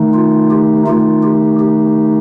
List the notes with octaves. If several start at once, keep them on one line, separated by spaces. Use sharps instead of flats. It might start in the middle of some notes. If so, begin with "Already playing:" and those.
Already playing: D#3 A3 D#4
F4
G4
D#3 A3 D#4 F4
G4
G4